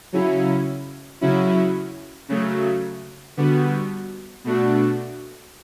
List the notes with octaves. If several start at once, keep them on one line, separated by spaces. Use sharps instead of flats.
C#3 F#3 C#4 E4
C#3 F#3 C#4 E4
C#3 F#3 A3
D3 G3 B3 F#4
B2 A3 D4 F#4